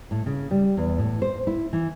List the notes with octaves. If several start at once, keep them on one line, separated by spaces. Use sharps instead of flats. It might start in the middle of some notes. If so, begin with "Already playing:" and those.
A2
C#3
G3
E2
A2
C5
E4
E3